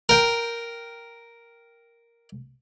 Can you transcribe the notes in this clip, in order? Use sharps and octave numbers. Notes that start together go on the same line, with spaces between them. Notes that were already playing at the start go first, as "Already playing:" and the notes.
A#4 G5